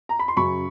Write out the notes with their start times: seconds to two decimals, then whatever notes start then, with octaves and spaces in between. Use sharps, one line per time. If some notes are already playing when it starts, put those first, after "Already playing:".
0.09 A#5
0.19 B5
0.28 C6
0.37 F#2 C#3 F#3 B5 C#6